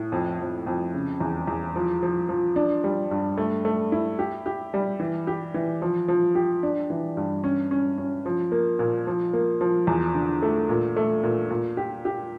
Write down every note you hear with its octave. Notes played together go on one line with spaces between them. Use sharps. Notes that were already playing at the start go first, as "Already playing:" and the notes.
Already playing: A2
F2
F2
F2
C#3
E2
E2
F3
F3
F3
D4
G3
G2
A3
A3
E4
G4
G4
G3
E3
G4
E3
F3
F3
G4
D4
E3
G2
C#4
C#4
C#4
F3
A#3
A#2
F3
A#3
F3
E2
D3
A3
A#2
A3
A#2
A#2
G4
G4